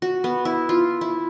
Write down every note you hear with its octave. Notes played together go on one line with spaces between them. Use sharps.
F#4
B3
E4
F4
E4